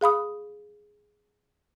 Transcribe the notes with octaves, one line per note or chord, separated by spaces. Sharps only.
G#4 F5 B5 D#6